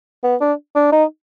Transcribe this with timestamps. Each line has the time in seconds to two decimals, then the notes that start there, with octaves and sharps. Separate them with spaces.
0.24 B3
0.41 D4
0.75 D4
0.92 D#4